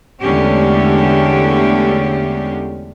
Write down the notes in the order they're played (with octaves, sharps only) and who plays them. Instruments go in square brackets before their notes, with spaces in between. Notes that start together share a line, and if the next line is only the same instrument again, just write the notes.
[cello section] E2 D3 G#3 A3 C#4 G4